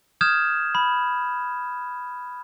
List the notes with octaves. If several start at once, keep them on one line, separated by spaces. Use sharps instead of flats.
D#6 F6 G6 G#6 E7
B5